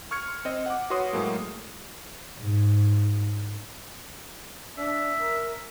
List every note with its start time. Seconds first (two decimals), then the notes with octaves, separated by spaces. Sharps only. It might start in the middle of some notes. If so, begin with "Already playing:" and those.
0.11 C#6 F6 G#6 C#7
0.28 C6
0.45 C4 D#5
0.66 F#5 D6
0.90 F#4 B4 C#5 C6 D#6
1.13 A2 F#3 G#3 A#3
2.38 G#2
4.78 D4 E5
5.20 A#4